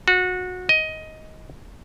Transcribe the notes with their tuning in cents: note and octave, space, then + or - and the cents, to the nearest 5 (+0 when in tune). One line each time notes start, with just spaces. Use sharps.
F#4 -20
D#5 +15